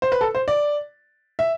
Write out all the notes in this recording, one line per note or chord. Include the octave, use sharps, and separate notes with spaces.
C5
B4
A4
C5
D5
E5